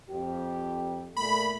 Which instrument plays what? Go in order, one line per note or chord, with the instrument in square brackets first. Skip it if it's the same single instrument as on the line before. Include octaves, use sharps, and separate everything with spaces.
[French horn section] F2 G4
[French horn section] A#2 A3 [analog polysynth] B5